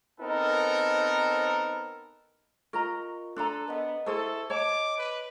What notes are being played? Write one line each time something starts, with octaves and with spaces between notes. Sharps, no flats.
B3 C4 D#4 A4 A#4
F4 A#4 D#5 A#5 C#6
D4 A4 A5 A#5 C6 F#6
B3 A#4 D#5 F#5
E4 G#4 A4 C5 A5 C#6
C#5 D#5 A5 D6
B4